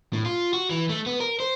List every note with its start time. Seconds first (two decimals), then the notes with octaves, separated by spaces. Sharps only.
0.13 A2
0.26 F4
0.53 F#4
0.70 E3
0.89 A3
1.06 B3
1.20 A#4
1.40 C5